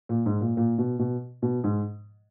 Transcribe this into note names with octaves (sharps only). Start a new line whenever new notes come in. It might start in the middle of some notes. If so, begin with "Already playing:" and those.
A#2
G#2
A#2
A#2
B2
B2
B2
G#2